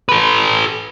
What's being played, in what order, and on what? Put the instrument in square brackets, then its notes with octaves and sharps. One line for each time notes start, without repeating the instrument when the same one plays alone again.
[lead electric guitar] A4 B4